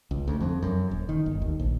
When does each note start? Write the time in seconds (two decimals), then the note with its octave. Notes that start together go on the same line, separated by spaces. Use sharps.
0.11 C#2
0.28 D2
0.41 F2
0.62 F#2
0.91 D#1
1.09 D#3
1.26 G1
1.42 D#2
1.60 A#1